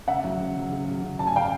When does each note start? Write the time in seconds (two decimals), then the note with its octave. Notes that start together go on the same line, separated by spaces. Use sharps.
0.07 C#3 E5 F#5
0.24 F#3
0.40 C#3
0.56 F#3
0.71 C#3
0.88 F#3
1.03 C#3
1.19 F#3 A5
1.27 G#5
1.36 C#3 F5 G5